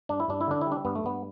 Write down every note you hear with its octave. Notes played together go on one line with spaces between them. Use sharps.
G2 D4
E4
G2 D4
E4
D3 D4
E4
G3
D4
G2 B3
A3
G2 B3